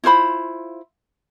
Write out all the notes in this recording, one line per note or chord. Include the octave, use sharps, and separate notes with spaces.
E4 F4 C5 B5